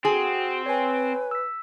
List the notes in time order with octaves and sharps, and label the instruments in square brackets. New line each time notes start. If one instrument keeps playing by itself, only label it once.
[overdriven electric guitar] C4 [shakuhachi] F#4 [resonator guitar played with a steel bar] G#4
[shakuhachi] B4 [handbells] C#5 G#5
[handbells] E6 B6